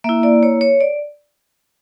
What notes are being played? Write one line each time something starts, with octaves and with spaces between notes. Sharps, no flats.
A#3 E4 E5
D5
C#5
C#5
D5